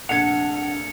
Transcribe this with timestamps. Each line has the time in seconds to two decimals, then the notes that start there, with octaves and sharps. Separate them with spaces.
0.09 F1 A#1 D4 F#5 G#6 C#7 F7